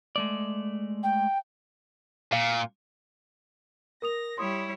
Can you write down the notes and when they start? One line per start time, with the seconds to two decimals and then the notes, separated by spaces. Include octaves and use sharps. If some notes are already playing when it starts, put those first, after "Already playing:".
0.16 G#3 A3 D5
1.03 G5
2.33 A#2 F5
4.02 A#4 D#6 A#6 F7
4.38 G3 E4 C#5 C6 D#6